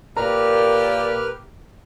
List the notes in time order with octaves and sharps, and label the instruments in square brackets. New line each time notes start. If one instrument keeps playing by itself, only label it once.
[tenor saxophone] A#2 [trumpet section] G4 [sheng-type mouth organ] A#4 B4 F6 [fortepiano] A#5